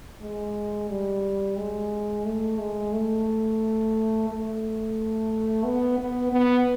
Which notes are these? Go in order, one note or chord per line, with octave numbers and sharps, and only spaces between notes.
G#3
G3
G#3
A3
G#3
A3
A3
B3
B3
B3